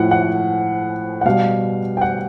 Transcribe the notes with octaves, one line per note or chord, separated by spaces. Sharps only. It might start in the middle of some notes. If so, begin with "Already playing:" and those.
Already playing: A2 F3 F#5
F#5
F#5
B2 G3 F5
G5
F#5